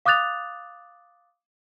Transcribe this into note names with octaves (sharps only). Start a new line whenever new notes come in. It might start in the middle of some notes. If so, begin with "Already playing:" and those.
F5 D6 D#6 F#6 A6 F7